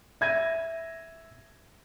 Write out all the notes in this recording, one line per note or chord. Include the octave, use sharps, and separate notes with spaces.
E5 G#6 A#6 D#7